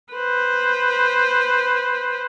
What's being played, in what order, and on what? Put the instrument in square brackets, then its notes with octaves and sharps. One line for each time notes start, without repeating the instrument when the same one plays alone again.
[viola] B4 C5